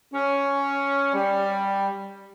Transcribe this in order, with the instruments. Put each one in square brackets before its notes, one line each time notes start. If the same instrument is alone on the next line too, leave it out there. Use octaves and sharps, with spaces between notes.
[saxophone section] C#4
G3